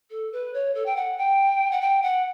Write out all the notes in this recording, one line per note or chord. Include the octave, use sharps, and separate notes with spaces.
A4
B4
C#5
A4
G5
F#5
G5
F#5
G5
F#5